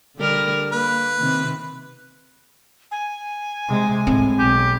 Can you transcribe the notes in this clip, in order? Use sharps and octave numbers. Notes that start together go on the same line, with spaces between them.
D3 G3 A#4
A#3 B4
C3 D#3 C4
G#5
C3 G#3
A2 G#3 C4
B1 G4